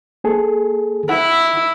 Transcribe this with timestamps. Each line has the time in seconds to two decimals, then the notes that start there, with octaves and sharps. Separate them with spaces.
0.24 A#3 G#4 A4
1.09 E4 F#5